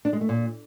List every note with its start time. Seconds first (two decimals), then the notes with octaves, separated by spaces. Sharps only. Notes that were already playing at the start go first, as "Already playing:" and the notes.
0.05 D4
0.13 G#3
0.21 A3
0.29 A#2